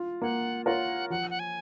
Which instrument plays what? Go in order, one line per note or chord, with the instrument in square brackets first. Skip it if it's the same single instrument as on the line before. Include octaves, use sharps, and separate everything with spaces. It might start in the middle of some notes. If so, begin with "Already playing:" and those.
Already playing: [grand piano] F4
[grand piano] A#3 [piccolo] F#5
[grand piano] F4 A#4 C#5 [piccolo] F#5
[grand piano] F3 [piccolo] F#5
[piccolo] F#5
G#5